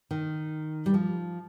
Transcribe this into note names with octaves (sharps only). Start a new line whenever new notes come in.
D#3
G3
F3